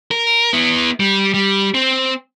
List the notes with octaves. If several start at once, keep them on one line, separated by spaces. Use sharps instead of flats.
A#4
B3 E4
G3
G3
C4